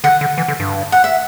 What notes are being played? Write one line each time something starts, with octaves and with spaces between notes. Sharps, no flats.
D3 F#5
D3
E3
D3
G2
F#5
E5